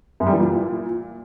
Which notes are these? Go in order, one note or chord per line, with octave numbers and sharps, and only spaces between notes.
F#2
G3
E3
A#2